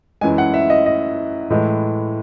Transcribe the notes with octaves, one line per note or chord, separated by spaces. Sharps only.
F#2 E3 G#3 G#5
F#5
E5
D#5
D#5
A2 E3 G#3